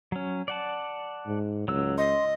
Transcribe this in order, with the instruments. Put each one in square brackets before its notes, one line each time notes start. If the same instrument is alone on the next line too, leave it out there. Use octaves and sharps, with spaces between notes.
[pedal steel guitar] F#3 C#4
D5 F#5 A5
[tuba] G#2
[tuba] C#2 [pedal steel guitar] F#3 E6
[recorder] D#5 [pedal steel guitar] C6